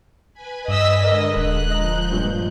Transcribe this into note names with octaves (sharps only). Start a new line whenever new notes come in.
B4 G#5 B5
G2 D#5 E6 B6
D3 G#3 A#4 D#5
D#1 F#6
F3 D#5 A#5 G6
G2 A#2 G#3